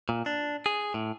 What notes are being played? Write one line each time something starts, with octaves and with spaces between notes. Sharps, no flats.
A#2
D4
G#4
A2